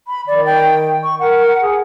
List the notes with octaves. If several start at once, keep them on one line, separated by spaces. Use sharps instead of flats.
B5
D#3 D5
G5
C#6
A#4 F#5
G#4